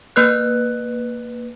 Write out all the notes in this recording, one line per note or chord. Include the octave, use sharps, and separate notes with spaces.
A#3 B4 F#6